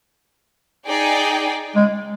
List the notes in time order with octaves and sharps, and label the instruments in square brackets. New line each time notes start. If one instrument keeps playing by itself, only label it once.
[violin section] D#4 G#4 D5 G5
[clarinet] G#3